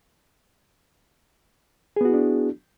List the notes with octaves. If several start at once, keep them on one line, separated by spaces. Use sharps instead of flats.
B3 D4 E4 F#4 G#4